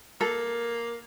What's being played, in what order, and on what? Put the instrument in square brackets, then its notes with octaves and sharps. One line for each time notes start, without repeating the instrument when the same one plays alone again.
[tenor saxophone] A#3 [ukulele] A4